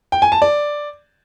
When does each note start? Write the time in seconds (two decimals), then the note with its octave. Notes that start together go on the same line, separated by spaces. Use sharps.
0.12 G5
0.22 G#5
0.32 A5
0.42 D5